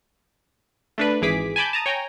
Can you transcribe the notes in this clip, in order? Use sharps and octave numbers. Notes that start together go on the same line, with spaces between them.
A3 D4 B4
G#1 E3 G#4 D6 B6
G#5 A5 B5 D6 G6
A5 A#5 D#6
C#5 G5 G#5 A#5